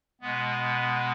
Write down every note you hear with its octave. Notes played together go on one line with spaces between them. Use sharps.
B2 G#3 B3